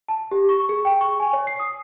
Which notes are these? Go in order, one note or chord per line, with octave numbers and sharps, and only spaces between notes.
A5
G4
C#6
G#4
G5
C#6
G#5
C#5
C7
D#6